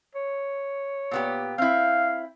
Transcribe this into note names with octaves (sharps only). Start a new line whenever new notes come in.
C#5
A#2 B3 G4
C4 E4 F5